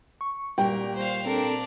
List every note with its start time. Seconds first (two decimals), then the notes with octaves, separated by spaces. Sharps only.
0.21 C#6
0.58 A#2 G3 A#4 G5
0.96 C5 F5
1.26 C4 D4 A4 A#4